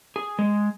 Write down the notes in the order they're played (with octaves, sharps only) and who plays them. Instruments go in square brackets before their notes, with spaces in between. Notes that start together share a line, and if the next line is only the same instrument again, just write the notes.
[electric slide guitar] G#4
G#3